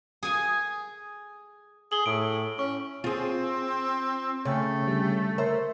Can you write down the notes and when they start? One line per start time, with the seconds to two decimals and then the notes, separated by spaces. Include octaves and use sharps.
0.23 G#4 G#5
1.92 G#4 F#7 G7
2.06 A2 D7
2.59 C#4 C#6
3.04 C4 F4 G#4
4.45 C#3 A3 C#5 G5
4.87 D3 G3
5.38 A#4 C5 C#5 E5